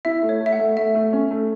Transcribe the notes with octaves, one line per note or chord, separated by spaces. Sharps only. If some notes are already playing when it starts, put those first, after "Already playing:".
E4 E5
A3
C#5
A3
E5
F#5
A3
A3 E5
A3
C#4
A3